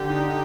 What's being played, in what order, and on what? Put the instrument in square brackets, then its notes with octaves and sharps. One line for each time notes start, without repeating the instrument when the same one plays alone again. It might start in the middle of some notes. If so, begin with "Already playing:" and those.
Already playing: [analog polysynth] D3 [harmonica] G4
[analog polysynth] D#4